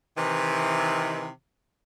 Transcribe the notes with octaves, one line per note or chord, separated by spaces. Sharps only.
C3 D#3 E3